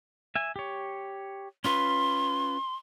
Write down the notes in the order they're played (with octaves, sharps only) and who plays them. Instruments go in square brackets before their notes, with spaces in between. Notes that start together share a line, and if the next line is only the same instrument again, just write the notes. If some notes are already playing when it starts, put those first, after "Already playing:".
[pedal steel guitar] E5 G#5
G4 C#5
[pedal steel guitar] C#4 F4 B4 [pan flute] C6